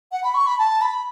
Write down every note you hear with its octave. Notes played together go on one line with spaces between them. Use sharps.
F#5
B5
C#6
B5
A5
B5